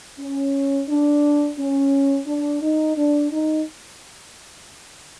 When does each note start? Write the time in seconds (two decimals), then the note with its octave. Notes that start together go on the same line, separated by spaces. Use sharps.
0.19 C#4
0.89 D4
1.58 C#4
2.27 D4
2.61 D#4
2.96 D4
3.31 D#4